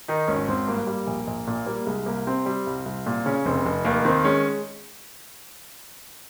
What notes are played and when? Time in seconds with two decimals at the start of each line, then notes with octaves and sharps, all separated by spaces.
0.08 D#3 D#4
0.28 G#1 C#4
0.48 G#1 C4
0.68 G2 A#3
0.87 G3
1.07 A#1
1.27 A#1
1.47 A#2
1.66 G3 A#3
1.86 C2 G#3
2.06 C2 A#3
2.27 C3 C4
2.46 G3
2.67 C2
2.86 C2
3.06 A#2
3.26 C#3 C#4
3.45 F1 C4
3.66 F1
3.85 D#2 A#3
4.05 D#3 C4
4.24 G#3 C#4